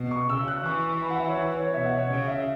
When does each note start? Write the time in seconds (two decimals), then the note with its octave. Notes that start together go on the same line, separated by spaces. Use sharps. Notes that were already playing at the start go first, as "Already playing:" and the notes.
Already playing: B2
0.11 C#6
0.29 C#3 E6
0.48 F#6
0.65 E3 C#6
0.83 C#6
1.02 B5
1.10 F#5
1.19 E5
1.29 C#5
1.38 B4
1.55 C#5
1.67 C#5
1.74 B2 E5
1.86 F#5
1.98 C#5
2.10 C#3 C#5
2.28 E5